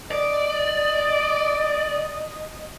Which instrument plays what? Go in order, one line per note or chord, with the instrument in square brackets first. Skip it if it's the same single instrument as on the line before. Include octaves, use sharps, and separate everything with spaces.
[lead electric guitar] D5 [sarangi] D#5